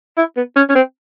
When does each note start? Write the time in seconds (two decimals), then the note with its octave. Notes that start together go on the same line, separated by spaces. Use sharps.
0.17 E4
0.36 B3
0.56 C#4
0.69 C#4
0.75 C4